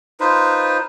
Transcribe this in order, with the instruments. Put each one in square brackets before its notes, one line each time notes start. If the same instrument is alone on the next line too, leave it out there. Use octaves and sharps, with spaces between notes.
[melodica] D#4 F4 B4 C5